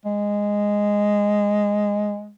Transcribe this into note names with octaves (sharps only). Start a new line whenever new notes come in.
G#3